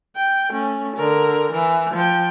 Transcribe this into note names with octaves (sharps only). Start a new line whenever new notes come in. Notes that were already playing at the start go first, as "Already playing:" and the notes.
G5
A3 C#4
D3 A#4
E3
F3 G5